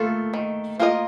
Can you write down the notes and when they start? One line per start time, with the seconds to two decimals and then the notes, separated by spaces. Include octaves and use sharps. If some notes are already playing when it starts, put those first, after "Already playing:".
Already playing: A3 A#3 F4 A4
0.34 D#3
0.80 A#3 F4 A#4 D#5